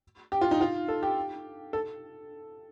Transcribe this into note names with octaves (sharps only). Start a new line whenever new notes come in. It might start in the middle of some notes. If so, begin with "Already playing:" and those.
G4
F4
D#4
F4
A4
G4
A4